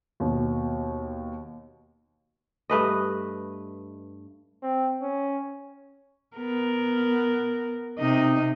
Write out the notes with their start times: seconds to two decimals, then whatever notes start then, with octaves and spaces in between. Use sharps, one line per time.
0.20 D#2 B2
2.70 G2 A3 B4 D#5
4.63 C4
5.02 C#4
6.37 B3 A#4
7.99 C3 D#4 D#5